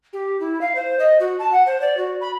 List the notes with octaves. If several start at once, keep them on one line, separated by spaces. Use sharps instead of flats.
G4
E4
F5
C5
D#5
F#4
A5
F#5
C5
D5
F#4
B5